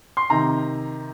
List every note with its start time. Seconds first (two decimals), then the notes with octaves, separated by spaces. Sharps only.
0.17 C6
0.30 C3 D#3 A#5